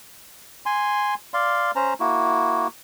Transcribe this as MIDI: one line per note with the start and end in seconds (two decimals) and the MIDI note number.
0.66 1.14 80
0.66 1.14 84
1.34 1.71 74
1.34 1.71 77
1.34 1.71 84
1.76 1.94 61
1.76 1.94 72
1.76 1.94 82
2.00 2.67 58
2.00 2.67 64
2.00 2.67 66